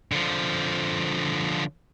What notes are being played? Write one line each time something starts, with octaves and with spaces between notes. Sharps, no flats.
D3 F3